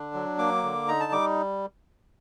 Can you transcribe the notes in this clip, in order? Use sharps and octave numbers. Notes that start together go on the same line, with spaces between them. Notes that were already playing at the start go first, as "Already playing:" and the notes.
Already playing: D3 D4
F#3
A#3 D6
D3
D#4 A#5
A5
G3 D6